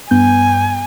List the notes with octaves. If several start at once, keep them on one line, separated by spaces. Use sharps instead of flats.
G2 B3 G#5 G6